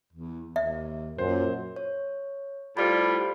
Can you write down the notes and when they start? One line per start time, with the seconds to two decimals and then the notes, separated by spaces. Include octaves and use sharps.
0.13 E2
0.56 D#2 E5
1.18 F#2 A#2 C5
1.76 C#5
2.77 A2 G3 F4 C5 D5 B5